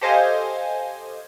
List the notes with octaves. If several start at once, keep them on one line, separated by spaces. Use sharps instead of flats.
G4 A4 C5 D#5 F5 G#5